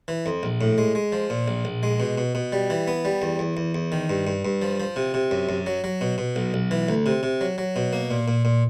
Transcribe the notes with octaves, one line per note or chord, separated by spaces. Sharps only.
E3
F2
A#1
A2
G#3
G#3
F3
A#2
A#1
A#1
G#3
B2
B2
B2
G3
E3
B3
G3
E2
E2
E2
E2
D#3
G2
G2
G2
F3
F3
C3
C3
F#2
F#2
F#3
F#3
B2
B2
B1
B1
E3
D2
C3
C3
F#3
F#3
B2
A#3
A#2
A#2
A#2